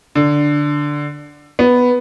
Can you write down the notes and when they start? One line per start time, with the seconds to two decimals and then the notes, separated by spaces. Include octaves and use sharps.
0.15 D3
1.59 B3